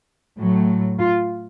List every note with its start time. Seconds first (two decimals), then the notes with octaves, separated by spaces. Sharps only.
0.39 A2 F#3 A3
0.99 F4